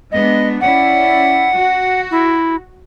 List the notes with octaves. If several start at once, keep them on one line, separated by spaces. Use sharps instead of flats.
G#3 B3 D4 D#5
C#4 E4 D5 F#5
F#4
E4